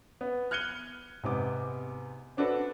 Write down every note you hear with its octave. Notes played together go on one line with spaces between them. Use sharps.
B3
F6 F#6 G#6 C#7 D#7 G7
G#2 C3 B3 D6
C4 D4 F#4 A4 B4